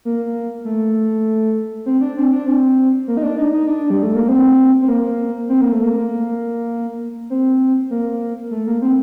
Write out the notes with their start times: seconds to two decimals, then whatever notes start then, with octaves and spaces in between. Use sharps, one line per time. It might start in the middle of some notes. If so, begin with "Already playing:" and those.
0.05 A#3
0.65 A3
1.86 C4
2.01 D4
2.17 C4
2.32 D4
2.46 C4
3.08 A#3
3.17 D#4
3.23 D4
3.37 D#4
3.53 D#4
3.67 D4
3.90 G3
4.03 A3
4.15 A#3
4.28 C4
4.82 C4
4.88 A#3
5.49 C4
5.61 A#3
5.72 A3
5.83 A#3
7.30 C4
7.90 A#3
8.51 A3
8.67 A#3
8.82 C4